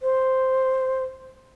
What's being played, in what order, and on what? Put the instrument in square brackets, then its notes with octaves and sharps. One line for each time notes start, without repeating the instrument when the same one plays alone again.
[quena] C5